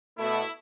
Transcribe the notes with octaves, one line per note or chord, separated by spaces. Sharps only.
B2 A3 E4